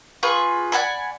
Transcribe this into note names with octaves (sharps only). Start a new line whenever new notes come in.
F4 G#4 B4 C#6
D5 F#5 G#5 B5